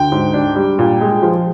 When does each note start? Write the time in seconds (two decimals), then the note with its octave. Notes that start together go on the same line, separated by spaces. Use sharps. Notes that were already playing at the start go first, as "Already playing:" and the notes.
Already playing: D2 G5
0.12 G#2
0.34 D4
0.56 G3
0.79 A#2
1.01 G#3
1.23 F3